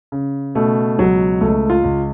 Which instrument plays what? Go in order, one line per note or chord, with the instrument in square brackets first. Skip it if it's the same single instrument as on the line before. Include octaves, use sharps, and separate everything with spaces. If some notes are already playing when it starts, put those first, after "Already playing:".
[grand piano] C#3
B2 A3
C#2 F#3
C#2 A3
F4
C#2